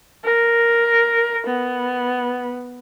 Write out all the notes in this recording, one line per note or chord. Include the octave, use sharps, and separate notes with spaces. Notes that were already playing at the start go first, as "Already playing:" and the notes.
A#4
B3